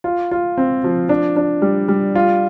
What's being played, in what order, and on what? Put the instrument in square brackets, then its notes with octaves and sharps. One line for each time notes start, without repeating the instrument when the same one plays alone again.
[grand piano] F4
F4
C4
F3
D4
D4
G3
G3
F4